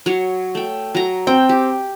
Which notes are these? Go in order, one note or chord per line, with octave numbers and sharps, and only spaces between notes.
F#3 C#5
A3 G5
F#3 A#5
C4 G5
G4